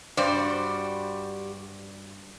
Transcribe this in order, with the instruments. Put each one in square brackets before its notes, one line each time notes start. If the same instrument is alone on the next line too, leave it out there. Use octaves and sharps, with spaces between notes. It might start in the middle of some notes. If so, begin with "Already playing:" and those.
[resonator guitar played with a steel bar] G2 D5 [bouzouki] G3 F#4 C5